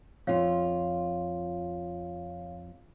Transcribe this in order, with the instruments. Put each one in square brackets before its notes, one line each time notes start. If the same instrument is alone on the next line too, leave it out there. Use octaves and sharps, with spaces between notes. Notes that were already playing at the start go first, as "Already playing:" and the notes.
[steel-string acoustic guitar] F2 F4 [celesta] C#5 F5